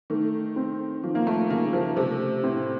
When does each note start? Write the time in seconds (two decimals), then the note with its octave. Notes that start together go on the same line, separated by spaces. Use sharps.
0.10 D#3 A3
0.56 C4
1.03 D#3 F3
1.15 A#3
1.27 A3
1.50 C#3 A#3
1.73 F3
1.97 C3 A3
2.43 A2 C4